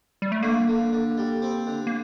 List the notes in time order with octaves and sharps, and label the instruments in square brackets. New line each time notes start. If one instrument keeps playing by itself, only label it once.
[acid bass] G3
A3
[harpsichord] D3 [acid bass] A#3
[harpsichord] D3
D3
G3
C4
D3
[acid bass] A#3